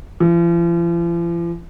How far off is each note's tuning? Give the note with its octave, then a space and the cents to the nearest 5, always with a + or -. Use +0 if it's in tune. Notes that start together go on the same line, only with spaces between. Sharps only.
F3 -45